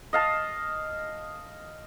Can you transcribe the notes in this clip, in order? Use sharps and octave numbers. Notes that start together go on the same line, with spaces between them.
D#5 F5 A5